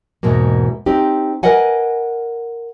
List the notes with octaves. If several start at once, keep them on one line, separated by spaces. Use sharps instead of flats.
E2 G#2 B2 G#3 A#3
C4 D#4 G4
A#4 B4 D#5 F#5 G#5